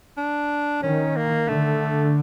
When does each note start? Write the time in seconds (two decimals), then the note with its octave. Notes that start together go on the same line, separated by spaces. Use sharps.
0.17 D4
0.83 D#3 C#4
1.16 A#3
1.48 D3 A3